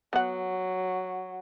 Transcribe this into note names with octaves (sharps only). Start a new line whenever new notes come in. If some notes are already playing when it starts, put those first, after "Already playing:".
F#3 B3 F#5